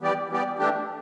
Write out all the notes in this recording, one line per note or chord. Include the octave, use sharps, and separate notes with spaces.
E3 G3 B3 G4 D5
E3 G3 B3 G4 D5
E3 A3 D4 G4